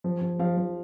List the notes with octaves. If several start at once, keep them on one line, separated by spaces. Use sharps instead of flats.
F3
F3
F3 F5
F3